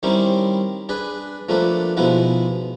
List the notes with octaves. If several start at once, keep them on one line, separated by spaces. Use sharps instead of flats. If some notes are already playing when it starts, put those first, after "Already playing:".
D#3 G3 C4 C#4 D#4 E4
D4 G#4 B4 B5
F3 A3 A#3 D4 A4 B4
B2 F3 G#3 B3 D#4 E4